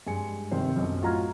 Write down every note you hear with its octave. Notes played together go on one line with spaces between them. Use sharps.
G2 G#3 G#5 C#7
G1 C3 D#3 C5
B1 F#2
A2 F4 F#4 A#5 F6 G#6